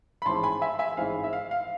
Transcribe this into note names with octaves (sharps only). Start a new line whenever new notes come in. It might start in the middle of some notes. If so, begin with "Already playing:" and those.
B5
A1 G#2 G#3 C4 E4 A5 C6
G#5 B5
E5 G#5
E5 G#5
A1 G#2 G#3 C4 E4 F5
E5
F5
F5